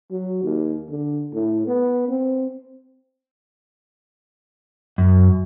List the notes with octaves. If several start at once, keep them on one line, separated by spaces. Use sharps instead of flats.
F#3
D#2
D3
A2
B3
C4
F#2